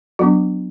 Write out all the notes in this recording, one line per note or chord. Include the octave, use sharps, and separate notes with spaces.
F#3 B3 D4 F#4